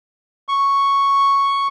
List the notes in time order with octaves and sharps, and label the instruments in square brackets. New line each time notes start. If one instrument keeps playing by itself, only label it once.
[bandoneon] C#6